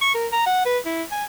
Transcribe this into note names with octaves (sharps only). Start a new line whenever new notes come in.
C#6
A#4
A#5
F#5
B4
E4
G#5